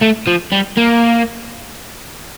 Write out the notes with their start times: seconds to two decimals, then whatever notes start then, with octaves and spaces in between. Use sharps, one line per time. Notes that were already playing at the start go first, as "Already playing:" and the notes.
0.02 A3
0.27 F3
0.52 G3
0.77 A#3